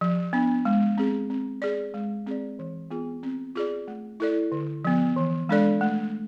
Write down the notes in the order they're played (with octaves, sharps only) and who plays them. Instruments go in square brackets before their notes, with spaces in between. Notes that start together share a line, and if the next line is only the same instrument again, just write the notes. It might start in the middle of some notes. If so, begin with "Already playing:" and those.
[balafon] F3
B3 D4
G#3
C4 G#4
C4
G#4 D5
G#3
C4 G#4 D5
E3
B3 F4 G#4
C4
F4 G#4 D5
A3
E4 A4 D5
D3
F3 B3
E3
G#3 D4 A4 D5
A3